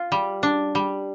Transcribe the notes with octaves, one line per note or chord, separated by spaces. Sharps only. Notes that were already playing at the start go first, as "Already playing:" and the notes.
Already playing: F4
G3
D4
G3